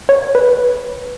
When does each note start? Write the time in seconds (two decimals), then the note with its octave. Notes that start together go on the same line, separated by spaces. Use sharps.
0.09 C#5
0.35 B4